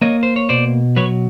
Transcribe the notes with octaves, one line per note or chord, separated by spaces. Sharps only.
A#3 C#5 D#5
C5
C#5
B2 C5 D5
F#3 B4 C#5